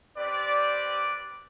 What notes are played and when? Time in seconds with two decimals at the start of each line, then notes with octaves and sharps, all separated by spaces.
0.17 C4 G4 B4 D5